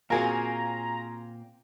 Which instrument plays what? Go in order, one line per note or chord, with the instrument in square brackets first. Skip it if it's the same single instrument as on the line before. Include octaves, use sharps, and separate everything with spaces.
[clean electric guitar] A#2 C4 [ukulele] F#4 G#4 A#4 [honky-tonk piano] F5 G#5 [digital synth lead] A#5